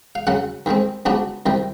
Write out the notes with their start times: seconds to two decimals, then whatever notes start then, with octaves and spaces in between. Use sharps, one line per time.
0.15 F5
0.27 F#2 C#3 F#3 F#5
0.66 D#2 D#3 G#3 C4
1.05 C#2 C#3 F#3 B3 D4
1.46 C2 C3 D#3 G3